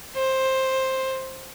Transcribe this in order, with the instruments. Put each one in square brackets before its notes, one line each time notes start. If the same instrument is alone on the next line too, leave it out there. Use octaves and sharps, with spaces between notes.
[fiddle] C5